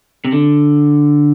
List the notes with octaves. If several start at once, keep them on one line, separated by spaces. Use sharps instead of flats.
C3
D3